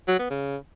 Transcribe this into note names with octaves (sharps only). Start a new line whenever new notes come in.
F#3
B3
C#3